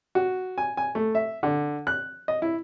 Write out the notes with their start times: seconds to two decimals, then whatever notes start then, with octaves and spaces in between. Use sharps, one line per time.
0.15 F#4
0.58 G#5
0.77 G#5
0.95 A3
1.15 E5
1.43 D3
1.87 F#6
2.28 D#5
2.42 E4